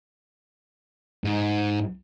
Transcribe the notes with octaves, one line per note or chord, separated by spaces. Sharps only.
G#2